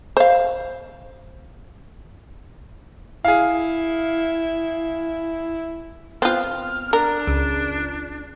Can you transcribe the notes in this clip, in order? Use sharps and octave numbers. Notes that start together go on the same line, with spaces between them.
C5 F5
E4 G#4 F5
B3 C4 F4 F6
D4 A#4
C#2